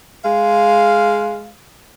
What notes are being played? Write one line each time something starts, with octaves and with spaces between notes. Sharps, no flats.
G#3 F5